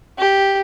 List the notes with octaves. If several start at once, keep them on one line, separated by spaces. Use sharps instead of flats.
G4